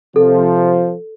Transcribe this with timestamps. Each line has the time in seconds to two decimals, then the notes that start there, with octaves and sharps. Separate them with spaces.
0.16 C3 F3 A4